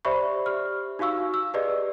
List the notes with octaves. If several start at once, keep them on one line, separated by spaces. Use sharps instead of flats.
G4 C5 D5 E5 B5 C#6
G4 F6
D#4 F#4 F5 C#6 E6
E6
G4 G#4 B4 D5 D#5